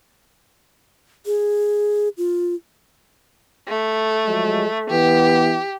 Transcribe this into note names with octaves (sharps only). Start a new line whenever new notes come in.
G#4
F4
A3
F3 F#3 G#3
E3 B3 G4